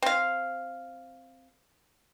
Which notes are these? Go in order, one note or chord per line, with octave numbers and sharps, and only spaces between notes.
C4 F5